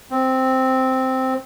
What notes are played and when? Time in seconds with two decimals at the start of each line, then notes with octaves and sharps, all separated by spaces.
0.11 C4